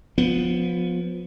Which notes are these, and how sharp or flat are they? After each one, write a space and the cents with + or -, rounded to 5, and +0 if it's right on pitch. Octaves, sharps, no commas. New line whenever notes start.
F3 +20 B3 +5